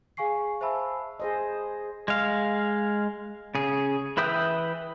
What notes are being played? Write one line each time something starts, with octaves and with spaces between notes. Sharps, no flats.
G#4 F5 G#5 C#6 C7
C5 E5 G#5 A5 B5 E6
G#4 C5 D#5
G#3 F5
C#3 G#4
E3 B4 E5 G5 D#6